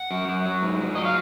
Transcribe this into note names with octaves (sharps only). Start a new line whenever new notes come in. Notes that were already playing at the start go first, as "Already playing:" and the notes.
Already playing: F#5
F#2
F#2
F#3
G#2
F#3
F#3 D#5
F5